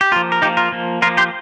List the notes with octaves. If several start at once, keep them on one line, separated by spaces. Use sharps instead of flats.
G4
F3 A#3 F4
A#4
F3 A#3 D#4 G4
F4 A#4
F3 A#3
F3 A#3 F4 A#4
G4 C5